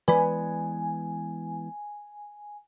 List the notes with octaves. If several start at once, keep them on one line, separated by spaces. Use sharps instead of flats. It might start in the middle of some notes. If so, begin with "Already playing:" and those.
E3 G#3 B3 B4 D5 G#5 B5